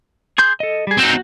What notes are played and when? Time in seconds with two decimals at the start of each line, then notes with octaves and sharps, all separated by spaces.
0.38 G#4 C6 G6
0.60 A4 D#5
0.87 G3 G#4
0.99 C4 D#4 F#4